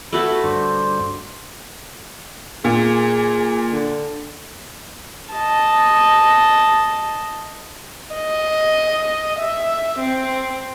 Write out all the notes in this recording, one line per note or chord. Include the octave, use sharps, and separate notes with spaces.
A3 E4 F#4 B4
G2 D3 D4 C5
A#2 G#4
D3
D#5 A5
D#5
E5
C4